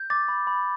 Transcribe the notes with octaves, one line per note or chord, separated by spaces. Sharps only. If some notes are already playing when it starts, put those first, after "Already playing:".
Already playing: G6
D6 A6
B5
B5